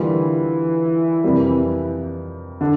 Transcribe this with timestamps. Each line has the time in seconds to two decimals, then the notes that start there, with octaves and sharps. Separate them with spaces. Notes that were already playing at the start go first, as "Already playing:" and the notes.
Already playing: D3 E3 G3 A#3 F4
1.24 F2 C3 G3 A#3
2.61 D3 D4